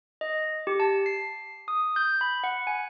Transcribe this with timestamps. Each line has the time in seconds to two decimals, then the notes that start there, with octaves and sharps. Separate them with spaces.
0.21 D#5
0.67 G4
0.80 A5
1.06 C7
1.68 D#6
1.96 G6
2.21 B5
2.44 F#5
2.67 G#5